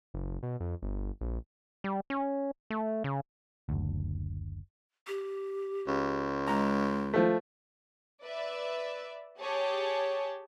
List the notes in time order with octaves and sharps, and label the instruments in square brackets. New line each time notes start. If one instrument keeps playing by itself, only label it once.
[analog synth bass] F#1
B2
F2
G1
A#1
[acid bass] G3
C#4
A3
C#3
[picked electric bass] F#1 D2
[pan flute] G4
[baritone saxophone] C#2
[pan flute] G#3 [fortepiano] A#5
[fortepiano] F3 A3
[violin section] B4 D5 E5
G4 G#4 C#5 A5